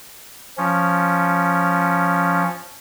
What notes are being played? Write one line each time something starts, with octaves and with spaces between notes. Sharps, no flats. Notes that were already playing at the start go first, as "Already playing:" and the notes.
F3 C#4